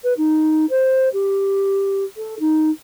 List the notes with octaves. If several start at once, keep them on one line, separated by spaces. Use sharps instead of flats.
B4
D#4
C5
G4
A4
D#4